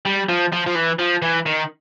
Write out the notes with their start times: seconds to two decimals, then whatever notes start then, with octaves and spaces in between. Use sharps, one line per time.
0.06 G3
0.29 F3
0.53 F3
0.66 F3
0.75 E3
0.99 F3
1.22 E3
1.46 D#3